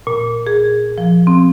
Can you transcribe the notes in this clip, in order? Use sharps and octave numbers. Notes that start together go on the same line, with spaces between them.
A#2
G#4
F3
C4